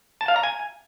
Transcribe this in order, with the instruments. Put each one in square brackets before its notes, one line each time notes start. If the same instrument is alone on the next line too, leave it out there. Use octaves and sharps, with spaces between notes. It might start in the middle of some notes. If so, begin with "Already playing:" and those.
[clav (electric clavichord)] A5
F5
A#5
G#5